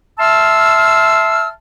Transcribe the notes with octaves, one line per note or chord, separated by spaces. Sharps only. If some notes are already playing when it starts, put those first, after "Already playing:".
E5 A5 C6 E6 F6